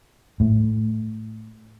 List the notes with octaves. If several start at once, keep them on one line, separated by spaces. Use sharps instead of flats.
A2